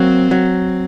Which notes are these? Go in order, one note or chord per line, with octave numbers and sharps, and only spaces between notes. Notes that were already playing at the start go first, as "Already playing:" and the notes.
Already playing: F#3 A#3 C4
F#3